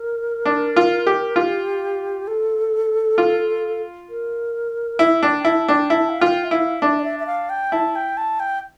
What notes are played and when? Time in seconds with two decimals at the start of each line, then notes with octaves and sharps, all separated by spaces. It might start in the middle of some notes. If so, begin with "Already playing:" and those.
Already playing: A#4
0.45 D4
0.76 F4
1.07 G4
1.36 F4 G4
2.28 A4
3.18 F4
4.09 A#4
4.99 E4 E5
5.23 D4 G5
5.40 G5
5.45 E4 A5
5.68 D4 G5
5.90 E4 A5
6.10 F5
6.20 F4 G5
6.44 E5
6.51 E4 F5
6.82 D4 E5
6.99 D5
7.04 E5
7.20 E5
7.27 F5
7.50 G5
7.72 E4 A5
7.96 G5
8.17 A5
8.40 G5